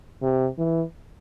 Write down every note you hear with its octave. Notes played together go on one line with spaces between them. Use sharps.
C3
E3